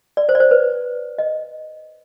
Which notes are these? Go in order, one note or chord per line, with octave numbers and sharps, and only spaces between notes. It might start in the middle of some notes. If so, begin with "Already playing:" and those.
D5
C5
D5
C5
B4
D#5